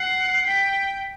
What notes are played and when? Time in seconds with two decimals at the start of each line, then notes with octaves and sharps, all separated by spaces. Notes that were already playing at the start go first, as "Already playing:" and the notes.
Already playing: F#5 C7
0.46 G5 B6